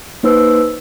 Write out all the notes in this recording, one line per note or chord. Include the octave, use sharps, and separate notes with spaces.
A#3 D#4 B4 C5 E6